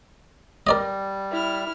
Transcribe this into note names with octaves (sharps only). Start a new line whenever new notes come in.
G3 A#4 D5 D#5
E4 F6